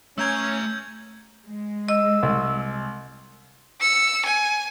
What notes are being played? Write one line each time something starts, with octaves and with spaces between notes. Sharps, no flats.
A3 C#4 A#5 E6 G6 G#6
G#3
D#5 E6
C2
E6 C#7
G#5